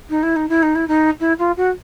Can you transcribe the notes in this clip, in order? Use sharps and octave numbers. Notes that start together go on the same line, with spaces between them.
D#4
E4
D#4
E4
D#4
E4
D#4
E4
F4
F#4